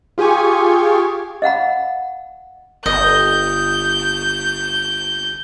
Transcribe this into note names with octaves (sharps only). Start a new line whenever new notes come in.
F4 G4 G#4 G#5 C#6
D#5 F5 F#5 B5
G1 D#5 G6